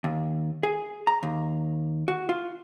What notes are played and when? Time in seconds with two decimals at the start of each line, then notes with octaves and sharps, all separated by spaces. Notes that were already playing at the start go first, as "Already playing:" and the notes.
0.04 D#2
0.63 G#4
1.07 A#5
1.23 D#2
2.08 F#4
2.29 F4